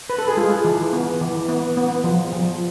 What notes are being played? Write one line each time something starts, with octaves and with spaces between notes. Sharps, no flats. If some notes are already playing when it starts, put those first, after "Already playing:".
B4
A4
G#4
G#3 F4
E3
B3
E3
B3
B3
F3
F3